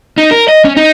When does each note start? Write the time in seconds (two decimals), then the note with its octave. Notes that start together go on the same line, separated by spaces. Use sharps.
0.18 D#4
0.31 A#4
0.48 D#5
0.65 C#4
0.77 D#4